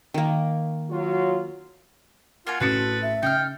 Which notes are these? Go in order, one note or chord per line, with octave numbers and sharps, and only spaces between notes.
D#3 A#3
F#3 F4 F#4
A#3 F4 F#4 G#5
A1 C4 F#4 A4 B4 D#6 A6 C#7
E5
C#3 D#4 F5 G5 F6